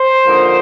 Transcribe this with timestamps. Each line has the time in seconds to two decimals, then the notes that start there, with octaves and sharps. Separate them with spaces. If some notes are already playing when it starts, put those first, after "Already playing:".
Already playing: C5
0.25 D3 F3 A#3 D#4